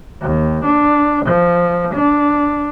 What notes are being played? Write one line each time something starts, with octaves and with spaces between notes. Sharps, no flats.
D#2
D4
F3
D4